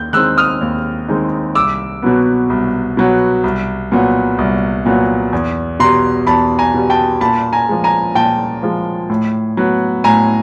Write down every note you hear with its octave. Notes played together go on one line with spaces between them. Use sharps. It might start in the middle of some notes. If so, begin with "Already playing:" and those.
Already playing: D#2 G6
D#3 G#3 C4 D#4 E6 F#6
D#6 F6
D#2
D#3 G#3 C4 D#4
C2 D6 E6
B2 F#3 B3
C2
B2 F#3 B3
C2
A#2 F#3 B3
C2
A#2 F#3 B3
E2
B2 G3 A#5 C6
E2 A5 B5
G#5 A#5
B2 G3
G5 A5
A#2 A5 B5
G#5 A#5
F3 G#3
G#5 A#5
A#2 G5 A5
F3 G#3
A2
F#3 B3
A2 G#5 A#5